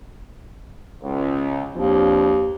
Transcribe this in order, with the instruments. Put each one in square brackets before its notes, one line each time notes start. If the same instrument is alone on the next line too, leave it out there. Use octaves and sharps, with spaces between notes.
[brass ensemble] C#2
[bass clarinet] D#2 [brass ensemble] F3 C4 D4